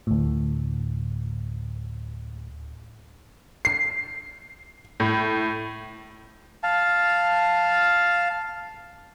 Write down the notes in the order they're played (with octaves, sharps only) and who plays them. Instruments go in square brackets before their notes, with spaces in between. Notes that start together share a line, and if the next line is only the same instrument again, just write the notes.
[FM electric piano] D2 A2
[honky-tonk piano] C7
A2
[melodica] F5 A5